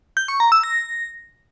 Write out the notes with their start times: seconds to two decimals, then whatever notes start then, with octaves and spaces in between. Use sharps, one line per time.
0.17 G6
0.28 C#6
0.40 A#5
0.52 E6
0.63 A#6